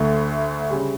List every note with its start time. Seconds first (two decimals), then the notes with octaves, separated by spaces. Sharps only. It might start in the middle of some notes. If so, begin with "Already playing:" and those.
Already playing: D2 D3 A3
0.70 C#3 G3